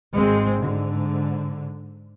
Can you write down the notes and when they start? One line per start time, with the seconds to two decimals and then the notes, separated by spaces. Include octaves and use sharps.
0.14 G#1 G#3 C4
0.59 G#2 D3